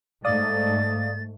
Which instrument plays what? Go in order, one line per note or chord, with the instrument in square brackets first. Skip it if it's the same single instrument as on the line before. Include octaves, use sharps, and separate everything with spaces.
[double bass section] G#2 A3 [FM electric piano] D5 F5 D#6 [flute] A6